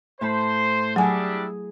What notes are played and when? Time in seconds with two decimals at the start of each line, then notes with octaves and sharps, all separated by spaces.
0.21 A2 C5 A5 B5
0.96 F#3 G3 D4 E4 G#4 G#5